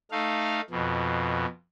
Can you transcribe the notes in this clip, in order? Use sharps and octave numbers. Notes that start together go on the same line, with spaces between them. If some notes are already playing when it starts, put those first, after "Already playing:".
A3 D#4 F5
F2 B2